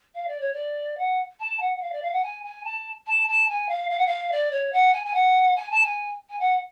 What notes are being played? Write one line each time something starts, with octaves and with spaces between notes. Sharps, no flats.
F5
D5
C#5
D5
F#5
A5
F#5
F#5
F5
D5
F5
F#5
G#5
G#5
A5
A5
A5
G#5
F5
F5
F#5
F5
D5
C#5
F#5
G#5
G#5
F#5
G#5
A5
G#5
G#5
F#5